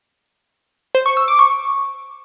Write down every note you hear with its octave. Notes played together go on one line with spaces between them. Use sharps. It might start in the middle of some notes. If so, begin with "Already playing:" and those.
C5
C#6
E6
D6
C#6